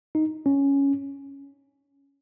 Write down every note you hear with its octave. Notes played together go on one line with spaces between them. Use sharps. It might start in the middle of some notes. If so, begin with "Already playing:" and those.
D#4
C#4